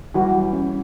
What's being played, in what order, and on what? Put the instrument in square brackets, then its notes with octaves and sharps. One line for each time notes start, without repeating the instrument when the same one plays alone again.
[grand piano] E3 G3 [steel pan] F#4
[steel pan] F#3
C#4